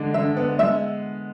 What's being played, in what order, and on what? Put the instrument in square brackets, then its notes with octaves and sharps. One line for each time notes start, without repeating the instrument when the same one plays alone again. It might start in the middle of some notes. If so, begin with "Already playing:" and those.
Already playing: [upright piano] D3 G#3 D4
[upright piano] D3 [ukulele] E5
[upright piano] B3
[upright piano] G#3 [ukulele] E5